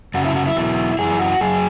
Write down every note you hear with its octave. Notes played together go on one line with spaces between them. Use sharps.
F#2 C#3 F#3 F#4
E4
F#4
E4
E2 B2 F#3
F#2 E3 G#4
F#4
F#2 F#3 G#4